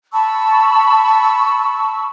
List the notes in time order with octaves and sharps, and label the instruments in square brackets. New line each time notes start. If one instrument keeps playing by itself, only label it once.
[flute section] A5 B5 C#6 E6